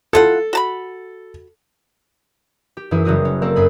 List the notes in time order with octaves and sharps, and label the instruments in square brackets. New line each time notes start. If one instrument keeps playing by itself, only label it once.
[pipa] E4 F4 F#5 [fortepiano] A4
[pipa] F#4 A5 B5
[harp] G4
F#2 E3 E4 G#4
F#1 F#3 G3 F#4 G#4 D#6
C#4
A#3 C4 A4 A#4 D5
F#2 G#4 G#5 B5